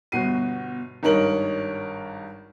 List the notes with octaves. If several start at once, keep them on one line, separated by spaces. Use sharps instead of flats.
G1 B2 F#4 C7 D#7
G#1 G2 D#4 A#4 C#5 F#7